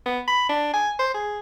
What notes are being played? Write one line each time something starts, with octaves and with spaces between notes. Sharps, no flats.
B3
B5
D4
G#5
C5
G#4